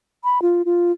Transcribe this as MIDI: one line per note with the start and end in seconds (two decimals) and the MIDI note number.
0.24 0.41 83
0.42 0.62 65
0.65 0.92 65